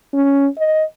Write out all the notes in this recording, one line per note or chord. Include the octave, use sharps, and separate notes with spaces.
C#4
D#5